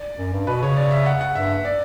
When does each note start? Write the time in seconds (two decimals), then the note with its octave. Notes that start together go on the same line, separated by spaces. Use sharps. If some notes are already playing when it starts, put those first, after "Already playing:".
Already playing: D5
0.18 F#2
0.33 G2
0.47 B2 B4
0.62 C#3 C#5
0.76 D5
0.91 E5
1.06 F#5
1.21 F#5
1.35 G2 E5
1.65 D5